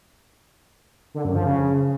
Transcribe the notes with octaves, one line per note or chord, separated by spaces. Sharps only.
D3
F#2
F3
C#3